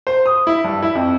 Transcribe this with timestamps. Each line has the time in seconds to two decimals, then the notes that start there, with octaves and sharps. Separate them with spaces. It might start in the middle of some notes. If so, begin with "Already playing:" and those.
0.07 C5
0.26 D#6
0.47 E4
0.64 G2
0.82 E4
0.95 F2